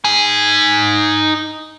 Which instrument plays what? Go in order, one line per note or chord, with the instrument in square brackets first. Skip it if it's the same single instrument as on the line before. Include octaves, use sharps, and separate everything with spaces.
[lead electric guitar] D#4 G#5